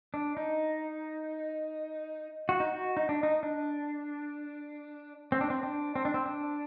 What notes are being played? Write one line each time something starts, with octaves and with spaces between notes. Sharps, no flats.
D4
D#4
F#4
D#4
F#4
D#4
D4
D#4
D4
C4
D4
C4
D4
C4
D4
C4
D4